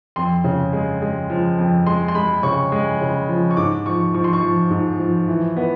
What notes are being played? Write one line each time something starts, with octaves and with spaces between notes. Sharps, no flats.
F2 C6
C#3
G#3
G#3
F3
F2
G#3 C6
C6
G#3 B5
C#3 C#6
G#3
C#3
F3
C#6
G#2 D6
F3 C#6
F3 C#6
C6
C#6
F3
G#2
F3
E3
B3